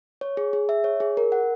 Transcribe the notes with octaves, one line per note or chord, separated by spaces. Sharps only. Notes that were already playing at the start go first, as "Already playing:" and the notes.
C#5
G#4
G#4
E5
C#5
G#4
A#4
F#5